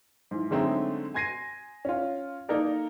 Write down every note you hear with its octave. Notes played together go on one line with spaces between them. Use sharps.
G#2 E3
D3 F#3 G#3 A3 C4 D#4
G#5 C6 G#6 A#6 C7 D#7
C#4 F4
A#3 D#4 A4 A#4 D5